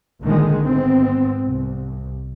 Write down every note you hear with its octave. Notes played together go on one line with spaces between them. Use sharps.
A#1 D3 D#3 G#3
G#2 B3 C4
C2